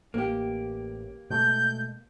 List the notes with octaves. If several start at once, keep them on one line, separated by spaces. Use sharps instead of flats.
A1 A#3 G4
B2 G#3 A3 G6